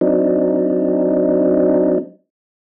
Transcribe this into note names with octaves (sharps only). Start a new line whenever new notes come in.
F#3 C4 D4 D#4